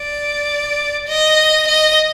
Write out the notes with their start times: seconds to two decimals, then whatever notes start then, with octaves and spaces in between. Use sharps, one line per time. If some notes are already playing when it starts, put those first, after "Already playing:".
Already playing: D5
1.08 D#5
1.68 D#5